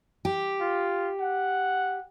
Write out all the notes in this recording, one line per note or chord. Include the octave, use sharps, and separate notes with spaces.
G4
F4
F#5